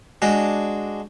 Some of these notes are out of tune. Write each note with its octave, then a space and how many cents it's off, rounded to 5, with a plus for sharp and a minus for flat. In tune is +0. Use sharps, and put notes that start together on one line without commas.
G#3 +0 D4 +0 F#4 +0